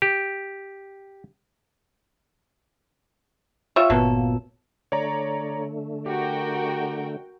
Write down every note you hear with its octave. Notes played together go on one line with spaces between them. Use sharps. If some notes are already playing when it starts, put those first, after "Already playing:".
G4
G3 F4 C#5 E5
G1 A#2 F#3 A#3 B3 A4
D3 A3 C#5 D5 A#5
F#4 G4 A#4 G5